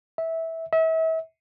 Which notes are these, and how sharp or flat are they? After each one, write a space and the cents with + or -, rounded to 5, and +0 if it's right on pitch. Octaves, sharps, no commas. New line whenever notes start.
E5 -15
E5 -35